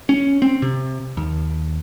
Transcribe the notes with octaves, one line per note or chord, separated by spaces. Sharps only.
C#4
C4
C3
D#2